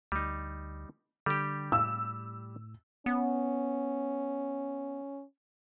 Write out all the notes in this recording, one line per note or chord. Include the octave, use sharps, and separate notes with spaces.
D2 G3 D#4
D3 G3 G4
A2 E6
B3 C#4